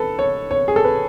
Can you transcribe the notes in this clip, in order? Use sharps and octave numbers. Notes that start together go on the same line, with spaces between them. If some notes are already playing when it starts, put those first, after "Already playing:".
Already playing: A4 B4
C#5
C#5
G#4
A4
B4